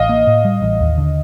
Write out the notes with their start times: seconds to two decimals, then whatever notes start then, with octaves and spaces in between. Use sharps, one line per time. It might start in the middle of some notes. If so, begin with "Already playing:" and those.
Already playing: A1 D#5 F5
0.09 A#3
0.27 A2
0.45 G3
0.62 A1
0.81 D#2
0.98 D3